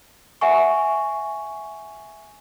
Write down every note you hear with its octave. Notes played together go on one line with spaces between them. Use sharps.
E5 F#5 G#5 C#6